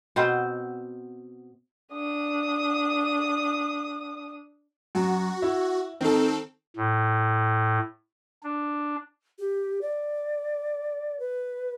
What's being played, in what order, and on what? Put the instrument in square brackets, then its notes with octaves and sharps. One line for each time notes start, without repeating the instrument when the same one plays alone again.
[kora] B2 B3 C4 C5
[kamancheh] D4 D#6
[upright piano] F#2 [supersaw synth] F#4
[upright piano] E4
[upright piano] D#3 D#4 A5 [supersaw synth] C4 A4
[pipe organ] A2
D4
[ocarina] G4
D5
B4